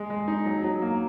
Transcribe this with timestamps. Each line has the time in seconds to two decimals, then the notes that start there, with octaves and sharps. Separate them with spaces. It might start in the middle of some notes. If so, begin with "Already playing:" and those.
Already playing: G#3
0.10 G#3
0.28 D#4
0.46 F#3
0.63 F#3
0.82 A#3